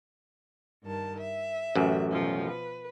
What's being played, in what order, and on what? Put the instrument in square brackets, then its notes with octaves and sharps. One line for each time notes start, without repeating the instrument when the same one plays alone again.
[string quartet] G2 D#3 A5
E5
[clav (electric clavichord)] A1 F#2
[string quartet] B2 F3 F#3
B4